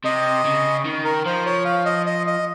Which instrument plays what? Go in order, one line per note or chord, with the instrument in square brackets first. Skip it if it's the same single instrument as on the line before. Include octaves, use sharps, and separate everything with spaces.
[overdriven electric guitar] C3 [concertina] D#5
[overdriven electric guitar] C#3
D#3
[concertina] A#4
[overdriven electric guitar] F3 [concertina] C5
[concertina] C#5
F5
D#5
D#5
D#5